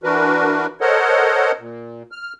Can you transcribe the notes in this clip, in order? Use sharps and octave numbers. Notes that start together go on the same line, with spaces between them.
E3 D4 F#4 A#4 B4
A4 A#4 C5 C#5 D#5 F#5
A#2
F6